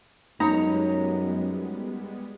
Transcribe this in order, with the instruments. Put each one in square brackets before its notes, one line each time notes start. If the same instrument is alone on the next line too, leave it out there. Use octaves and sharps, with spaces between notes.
[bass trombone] F#2 [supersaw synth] G3 G#3 B3 [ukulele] D#4 [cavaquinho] C#5 A#5